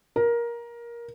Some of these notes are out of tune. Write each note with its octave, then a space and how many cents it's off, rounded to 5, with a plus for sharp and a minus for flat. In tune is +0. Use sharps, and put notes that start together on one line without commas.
A#4 +15